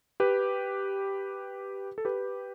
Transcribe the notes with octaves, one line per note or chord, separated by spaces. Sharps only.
G4 B4
A4
G4 B4